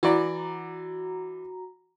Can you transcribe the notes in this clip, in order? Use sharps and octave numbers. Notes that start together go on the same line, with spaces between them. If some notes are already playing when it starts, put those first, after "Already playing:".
E3 F#4 D5 A#5